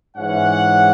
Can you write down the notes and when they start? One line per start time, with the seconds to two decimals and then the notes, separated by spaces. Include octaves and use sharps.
0.16 G#2 E3 C#4 F#5